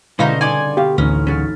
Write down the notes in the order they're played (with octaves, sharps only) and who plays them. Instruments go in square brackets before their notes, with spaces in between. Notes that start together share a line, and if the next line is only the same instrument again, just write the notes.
[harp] B2 D3 [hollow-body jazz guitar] G#3 E4 F5 [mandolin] C#4 D#4 C5
[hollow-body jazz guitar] G2 C#3 D#4 [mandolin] D5 G#5 [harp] C6
[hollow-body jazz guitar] B2 F5 [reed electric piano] G4
[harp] A1 D#4 F6 [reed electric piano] D2 [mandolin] C#4
[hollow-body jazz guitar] C#3 F#3 [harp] F6 A6 B6